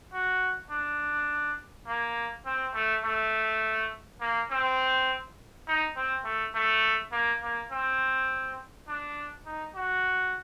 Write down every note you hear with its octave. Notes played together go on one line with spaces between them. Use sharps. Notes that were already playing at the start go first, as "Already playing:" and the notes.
F#4
D4
A#3
C4
A3
A3
A#3
C4
D#4
C4
A3
A3
A#3
A#3
C4
D4
D#4
F#4